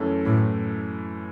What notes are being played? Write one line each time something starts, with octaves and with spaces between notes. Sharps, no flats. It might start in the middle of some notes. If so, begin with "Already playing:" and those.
Already playing: F#2 E3 A3 C#4 A4
F#2 A2 E3 A3 E4